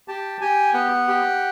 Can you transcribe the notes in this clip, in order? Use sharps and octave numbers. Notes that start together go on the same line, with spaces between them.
G4 A5
G4 G#5
B3 F#5
G4